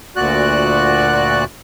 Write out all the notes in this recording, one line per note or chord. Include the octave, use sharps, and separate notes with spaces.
D2 A#2 F#4 D5 F#6